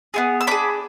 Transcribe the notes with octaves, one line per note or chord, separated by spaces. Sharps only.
B3 E4 G#4
E6
D4 G#4 B5 D6